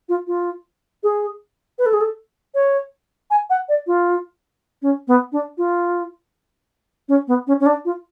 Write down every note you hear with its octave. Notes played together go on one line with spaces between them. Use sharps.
F4
F4
G#4
B4
A4
G#4
A4
C#5
G#5
F#5
D5
F4
C#4
B3
D4
F4
C#4
B3
C#4
C#4
D4
F4